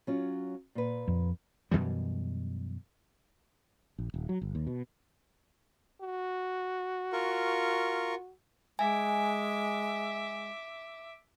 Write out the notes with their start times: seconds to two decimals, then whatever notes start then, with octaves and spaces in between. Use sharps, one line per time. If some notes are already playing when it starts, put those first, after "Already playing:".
0.07 F#3 C#4 F4
0.75 A#2 B4
1.08 F2
1.71 F#2 B2 E3 G3
3.98 A#1
4.14 D#1
4.29 F#3
4.41 G1
4.55 D#2
4.67 B2
6.01 F#4
7.12 F4 A#4 C#6
8.79 G#3 E5 G#5 D6